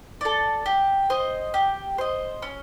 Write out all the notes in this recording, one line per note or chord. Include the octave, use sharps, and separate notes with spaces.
A4 D5
G4
C5 D#5
G4
C5 D#5
C#4